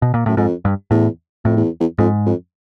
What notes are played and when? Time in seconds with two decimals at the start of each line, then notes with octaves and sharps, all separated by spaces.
0.02 B2
0.14 A#2
0.26 F#2 A2
0.37 F2 G#2
0.65 G2
0.91 E2 A2
1.45 F2 A2
1.57 E2
1.80 E2
1.99 F2 G#2
2.26 F2